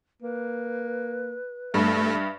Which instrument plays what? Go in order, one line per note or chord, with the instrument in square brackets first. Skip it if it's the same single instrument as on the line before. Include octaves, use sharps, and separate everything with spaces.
[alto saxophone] A#3 [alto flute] B4
[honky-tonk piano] G2 [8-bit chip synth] A3 [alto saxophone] E5